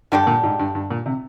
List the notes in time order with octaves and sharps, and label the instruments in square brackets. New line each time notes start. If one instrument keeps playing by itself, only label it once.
[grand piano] G2 [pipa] D3 G3 D4 G4
[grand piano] A#2
G#2
G2
G2
A#2
C3